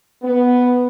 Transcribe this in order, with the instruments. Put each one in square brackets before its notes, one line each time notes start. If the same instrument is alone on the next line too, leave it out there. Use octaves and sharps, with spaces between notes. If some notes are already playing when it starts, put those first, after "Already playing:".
[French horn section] B3